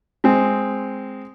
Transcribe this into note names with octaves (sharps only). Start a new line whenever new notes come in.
G#3 C4